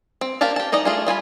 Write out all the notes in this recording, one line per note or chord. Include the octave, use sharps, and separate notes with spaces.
C4
A#3 D4 G4 F5 A5
G4 A5
E3 D#4 D5 D#5
A3 F4 G#4
G3 F4 G#5 B5